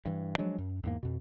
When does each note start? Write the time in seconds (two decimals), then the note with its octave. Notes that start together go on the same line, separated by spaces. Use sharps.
0.05 G2 E3
0.38 F3 F#3 G#3 D4
0.58 F#2
0.83 E2 G#2 A#3
1.03 F2 B2